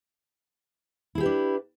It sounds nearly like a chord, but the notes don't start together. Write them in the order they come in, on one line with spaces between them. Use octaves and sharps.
E4 G#4 G4 B4 D4